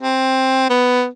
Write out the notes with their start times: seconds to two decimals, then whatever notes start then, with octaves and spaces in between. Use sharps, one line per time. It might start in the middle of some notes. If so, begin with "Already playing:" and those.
0.01 C4
0.70 B3